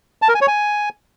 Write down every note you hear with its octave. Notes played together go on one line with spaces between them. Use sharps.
A5
A#4
G#5
C#5
G#5